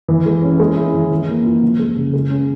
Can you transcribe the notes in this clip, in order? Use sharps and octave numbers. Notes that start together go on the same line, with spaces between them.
E3
G#3
C#4
G#3
E4
E3
E3
A#3
F4
F3
G#3
C#3
G#3
C#4